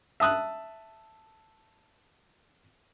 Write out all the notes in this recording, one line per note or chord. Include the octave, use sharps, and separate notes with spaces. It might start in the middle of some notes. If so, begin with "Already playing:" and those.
E5 A5 D#6 F#6